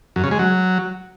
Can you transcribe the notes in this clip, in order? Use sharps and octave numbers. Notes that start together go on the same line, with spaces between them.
F#2
C#3
G#3
F#3